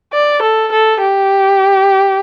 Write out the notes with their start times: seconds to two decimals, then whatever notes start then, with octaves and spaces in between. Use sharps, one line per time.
0.13 D5
0.42 A4
0.72 A4
1.02 G4